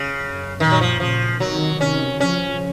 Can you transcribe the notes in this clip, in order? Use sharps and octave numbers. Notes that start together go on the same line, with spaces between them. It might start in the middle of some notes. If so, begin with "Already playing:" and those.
Already playing: C#3
F#2
F#2 A#2 D#3
F#3
F3
A#2 C#3 F3
C3 D#3 F#3
C3 D#3 C#4
C#3 F3 C#4